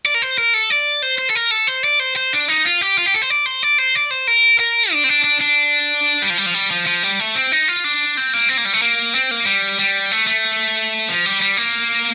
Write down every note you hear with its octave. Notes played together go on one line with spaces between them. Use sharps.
D5
A#4
C5
A#4
A4
D5
C5
C5
A4
A#4
A4
C5
D5
C5
C5
D4
D#4
F4
G4
F4
G4
A4
C5
D5
C5
D5
C5
D5
C5
A#4
A#4
D4
C4
D4
D4
D4
G3
F3
G3
F3
G3
F3
F3
G3
A3
C4
D#4
F4
D4
C4
A#3
C4
A#3
G3
A3
A#3
C4
A#3
G3
G3
A3
A3
F3
G3
G3
A#3